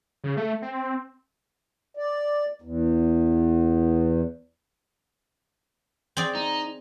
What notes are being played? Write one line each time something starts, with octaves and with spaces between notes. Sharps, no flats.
C#3
A3
C4
D5
E2
C4 G#4 D5
D#4